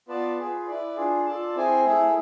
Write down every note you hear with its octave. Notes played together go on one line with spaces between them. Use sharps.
B3 F4 B4 D5 A5
F4 G#4 B4
E4 B4 D5
D4 F4 G#4
F4 A4 D5 A5
C4 E4 G#4 C5 G#5
A3 E4 G#4